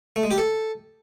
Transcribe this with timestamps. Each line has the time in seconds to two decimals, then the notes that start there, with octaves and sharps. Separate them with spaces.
0.16 A3
0.23 G#3
0.31 G4
0.38 A4